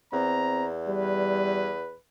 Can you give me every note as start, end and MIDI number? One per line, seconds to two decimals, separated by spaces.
0.13 1.93 40
0.13 0.66 60
0.13 0.68 82
0.88 1.72 55
0.88 1.98 71